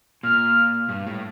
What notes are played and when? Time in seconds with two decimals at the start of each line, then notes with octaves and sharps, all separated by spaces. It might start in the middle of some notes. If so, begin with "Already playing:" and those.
0.23 A#2 F6
0.89 G2
1.07 A2